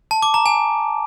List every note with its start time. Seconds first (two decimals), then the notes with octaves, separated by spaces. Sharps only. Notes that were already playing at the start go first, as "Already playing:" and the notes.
0.11 A5
0.22 D6
0.34 A#5
0.46 G#5